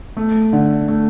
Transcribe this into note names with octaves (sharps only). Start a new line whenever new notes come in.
A3
D3
A3